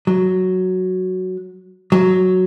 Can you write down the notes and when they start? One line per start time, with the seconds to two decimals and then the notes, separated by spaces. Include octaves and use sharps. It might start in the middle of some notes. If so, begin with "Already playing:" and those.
0.07 F#3
1.92 F#3